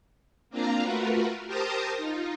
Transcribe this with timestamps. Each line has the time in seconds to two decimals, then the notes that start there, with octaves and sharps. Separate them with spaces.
0.50 A#3 C4 D4 F4 F5 A#5
0.81 A3 F4 F#4 A#4 B4
1.46 G4 A#4 C5 A5 A#5 D#6
1.97 D#4 F4